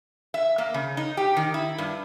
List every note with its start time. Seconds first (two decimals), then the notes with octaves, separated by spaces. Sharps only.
0.34 E5
0.58 A#3
0.74 C#3
0.97 D#4
1.17 G4
1.37 D#3
1.54 E4
1.78 G2